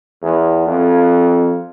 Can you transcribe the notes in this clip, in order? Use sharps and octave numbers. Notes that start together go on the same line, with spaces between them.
E2
F2